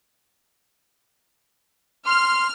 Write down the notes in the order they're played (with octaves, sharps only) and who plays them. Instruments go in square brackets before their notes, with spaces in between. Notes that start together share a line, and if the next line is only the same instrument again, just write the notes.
[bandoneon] C6 [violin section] F6